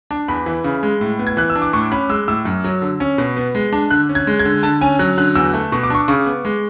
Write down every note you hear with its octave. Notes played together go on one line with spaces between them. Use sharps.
D4
E2 B5
E3
C#3
G#3
A2
B3
G#6
E3 F#6
E6
D4
D6
A2 C#6
C#4 B5
G#3 E6
A2 E6
F#2
F#3
D3
C#4
B2
B3
G#3
D4
D3 F#6
C#4
G#6
G#3
G#6
D3
D3 A5
C#4 G#5
F#3 F#6
D3 F#6
E2 E6
A3
B2 C#6
D6
D4 C#6
C#3 C#6
B3
G#3